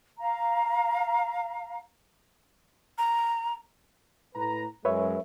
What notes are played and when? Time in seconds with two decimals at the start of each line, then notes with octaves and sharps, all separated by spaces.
0.19 F5 A#5
2.98 A#5
4.36 A2 B4 A#5
4.85 F#2 G#3 B4 C#5 E5